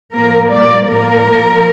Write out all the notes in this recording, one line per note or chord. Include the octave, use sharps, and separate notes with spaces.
A2 F3 A#3 A#4
A#2 G3 A#3 D5
A2 F3 A#3 A#4
A#2 F3 A#3